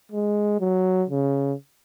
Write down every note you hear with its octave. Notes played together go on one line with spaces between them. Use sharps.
G#3
F#3
C#3